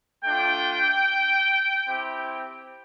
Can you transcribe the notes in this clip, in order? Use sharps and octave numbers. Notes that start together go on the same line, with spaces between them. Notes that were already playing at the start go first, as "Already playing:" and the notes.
A3 D4 F4 G5
C4 E4 G4